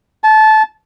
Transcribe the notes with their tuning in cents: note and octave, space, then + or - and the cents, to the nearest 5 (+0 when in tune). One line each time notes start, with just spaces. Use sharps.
A5 -20